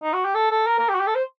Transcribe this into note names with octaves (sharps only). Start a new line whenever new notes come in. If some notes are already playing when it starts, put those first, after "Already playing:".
D#4
F#4
G4
A4
A4
A#4
A#4
G4
F#4
G4
A4
C5